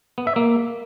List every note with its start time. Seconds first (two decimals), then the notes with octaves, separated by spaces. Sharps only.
0.18 B3
0.27 E5
0.36 A#3